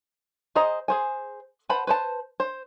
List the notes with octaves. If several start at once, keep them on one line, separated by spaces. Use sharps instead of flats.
G#4 C5 D#5 A#5
G#4 C5 G#5
B4 C5 F#5 A5 B5
B4 C5 A5
C5